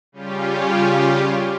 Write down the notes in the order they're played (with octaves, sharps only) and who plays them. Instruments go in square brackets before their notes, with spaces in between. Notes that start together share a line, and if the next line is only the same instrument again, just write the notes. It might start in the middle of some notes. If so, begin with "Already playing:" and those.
[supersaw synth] C#3 G3 C#4 F4 G4